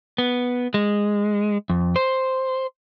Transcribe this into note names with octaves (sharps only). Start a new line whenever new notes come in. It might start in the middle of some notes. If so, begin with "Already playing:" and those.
B3
G#3
F2
C5